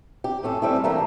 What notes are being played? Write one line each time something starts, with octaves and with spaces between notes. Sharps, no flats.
G4
A2 C#4 A4
G3 A3 C4 C#4 E4
G2 E3 G3 A3 A#3